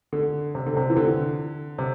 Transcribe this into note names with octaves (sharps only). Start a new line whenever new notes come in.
D3
C3
D3
C3
E3
D3
C3